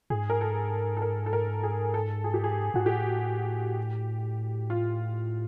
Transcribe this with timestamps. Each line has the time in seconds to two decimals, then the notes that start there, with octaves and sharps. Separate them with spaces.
0.10 G#2 G#4
0.30 A#4
0.41 A4
0.97 A4
1.02 A#4
1.26 A4
1.33 A#4
1.63 G#4
1.94 A4
2.24 G#4
2.34 G4
2.44 G#4
2.74 G#2 F#4
2.85 A2 G4
4.70 F4